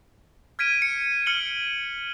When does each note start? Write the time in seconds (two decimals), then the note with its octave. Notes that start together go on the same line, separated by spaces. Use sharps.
0.59 F6 G#6 B6 D7 D#7
0.82 C#7
1.26 F6 C#7 F#7 G7